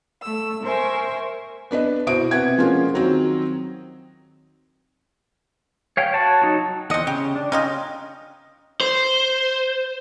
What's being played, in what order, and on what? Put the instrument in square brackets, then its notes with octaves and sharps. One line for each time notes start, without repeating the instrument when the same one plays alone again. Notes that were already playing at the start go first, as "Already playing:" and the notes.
[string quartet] A3 E6
A#4 C5 E5 G#5 C#6
[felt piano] B3 D4 B4 D#5
B2 E4 F#4 C5 D#6 D7
C3 B4 F#5 G#6
F3 G#3 A#3 C#4 F4
D#3 F#3 C4
[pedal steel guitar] C#5 F5 G5
F#4 C#5 A5
F#3 D#4 F#4
[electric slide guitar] E2 D#5 [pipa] C4 F#5
[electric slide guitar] C#3 [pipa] G4
[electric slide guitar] D4
[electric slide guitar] C#4 D#5 [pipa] D#4 F4 G4
[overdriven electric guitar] C5